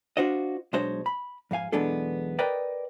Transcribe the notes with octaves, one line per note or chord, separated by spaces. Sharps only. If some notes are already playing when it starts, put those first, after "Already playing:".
D4 F4 F#4 C5 D#5
B1 G#3 D4 C5 C#5 D#5
B5
F2 G#2 F5 G#5
B1 E2 G#3 B3 D4 A4
A#4 B4 D5 D#5 G5